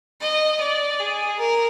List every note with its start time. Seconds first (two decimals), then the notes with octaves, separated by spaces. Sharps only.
0.21 D#5
0.61 D5
1.00 G#4
1.39 A#4